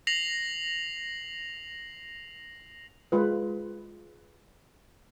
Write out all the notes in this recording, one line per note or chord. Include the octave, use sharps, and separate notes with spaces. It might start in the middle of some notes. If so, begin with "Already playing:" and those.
A#6 C7 F7 F#7
G#3 F4 B4